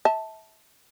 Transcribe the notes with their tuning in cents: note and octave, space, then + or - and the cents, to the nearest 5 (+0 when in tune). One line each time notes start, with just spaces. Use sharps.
E5 -25 A5 +0